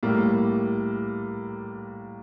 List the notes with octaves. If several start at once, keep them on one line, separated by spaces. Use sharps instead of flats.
A2 G3 A#3